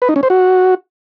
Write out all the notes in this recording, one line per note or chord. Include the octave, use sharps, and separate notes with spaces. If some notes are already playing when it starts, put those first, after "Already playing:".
B4
D#4
C#4
C5
F#4